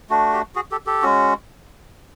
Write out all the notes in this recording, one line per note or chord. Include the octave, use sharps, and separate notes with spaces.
A3 D4 F#4
G4
F#4 G#4
G4 A4
G4 A4
G#3 C#4 F#4